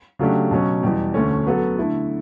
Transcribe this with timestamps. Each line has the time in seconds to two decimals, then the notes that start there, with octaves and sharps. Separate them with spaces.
0.19 C#3 F#3 A3 D4 G4
0.51 B2 F#3 C#4
0.83 E2 B2 G3
1.14 D2 D3 A3 C#4
1.46 F#3 B3 F#4 A4
1.78 D3 A3 E4 A4